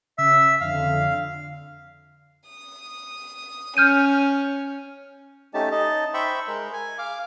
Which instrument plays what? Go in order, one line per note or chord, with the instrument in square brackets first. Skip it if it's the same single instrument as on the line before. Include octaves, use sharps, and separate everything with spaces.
[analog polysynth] C#3 [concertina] E5 E6
[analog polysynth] F2 D3 [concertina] F5
[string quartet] D#6
[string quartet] C#4 [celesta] F6 G6 D#7
[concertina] A3 C#4 D#4 G4 A5
D#4 D#5 A5
C5 E5 G5 B5 C#6
G#3 A#4
G#5
F5 D6